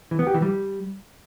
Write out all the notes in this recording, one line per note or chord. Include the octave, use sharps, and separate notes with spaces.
E3
B3
G4
E3
G3